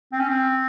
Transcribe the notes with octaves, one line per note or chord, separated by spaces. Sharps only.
C4
C#4
C4